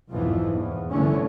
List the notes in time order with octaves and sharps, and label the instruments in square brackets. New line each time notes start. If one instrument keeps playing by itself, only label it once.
[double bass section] B1 F2 G#2 E3 F3
E2
C2 G2 D3 E3 A3 C#4